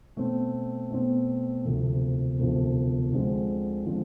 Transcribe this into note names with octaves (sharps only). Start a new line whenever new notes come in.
B2 A3 C4
B2 A3 C4
E1 D2 C3 F3
E1 D2 C3 F3
D2 D3 F3 G#3 C4
D3 F3 G#3 C4